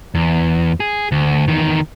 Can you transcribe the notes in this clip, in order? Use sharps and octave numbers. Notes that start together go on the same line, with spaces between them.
E2
G#4
D2
E2 D#3